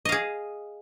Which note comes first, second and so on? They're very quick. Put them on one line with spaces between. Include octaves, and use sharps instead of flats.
D#5 F5 G#4